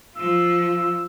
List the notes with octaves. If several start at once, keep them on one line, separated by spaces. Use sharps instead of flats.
F3 F4 E6